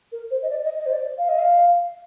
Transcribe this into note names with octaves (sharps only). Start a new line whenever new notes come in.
A#4
C5
D#5
D5
D#5
D#5
C5
D5
F5
D#5
F5